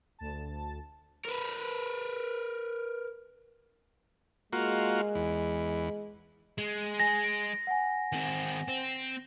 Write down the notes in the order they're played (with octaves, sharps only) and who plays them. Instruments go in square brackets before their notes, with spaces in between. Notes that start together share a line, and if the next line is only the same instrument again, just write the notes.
[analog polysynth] D2 A5
[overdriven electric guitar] A#4 B4
[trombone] G#3 [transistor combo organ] A#3 F4 F#4
[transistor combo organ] E2
[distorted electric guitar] G#3
[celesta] G#5 [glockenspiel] A#6
[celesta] D7
F#5 G#5
[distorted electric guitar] D#3 C4
C4